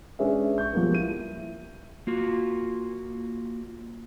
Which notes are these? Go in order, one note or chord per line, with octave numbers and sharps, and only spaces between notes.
G#3 C#4 D4 G#4 B4 E5
C#6 G6
F3 G3 G#3 A#3 B3
E4 D#7
A#3 F4 F#4